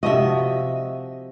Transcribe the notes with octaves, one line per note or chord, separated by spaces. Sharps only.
C3 F3 F#4 D#5 E5